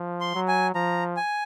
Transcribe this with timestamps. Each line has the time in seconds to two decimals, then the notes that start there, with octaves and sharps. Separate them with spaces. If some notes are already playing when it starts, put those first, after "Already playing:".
Already playing: F3
0.21 C6
0.35 F#3
0.48 G#5
0.75 F3 A#5
1.17 G#5